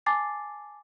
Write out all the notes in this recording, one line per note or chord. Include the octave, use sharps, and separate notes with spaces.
G#5 A5 D6 A6 C7